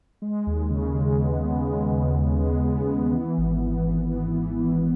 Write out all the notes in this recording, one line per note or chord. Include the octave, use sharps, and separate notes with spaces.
G#3
D#2
C#3
G#3
B3
B3
G#3
C#3
D#2
G#3
B3
B3
E3
G#1
E3
G#1
E3
E3
E3